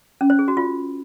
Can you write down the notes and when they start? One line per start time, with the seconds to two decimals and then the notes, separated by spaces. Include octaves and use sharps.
0.21 C#4
0.30 C5
0.39 G#4
0.48 F#4
0.57 F4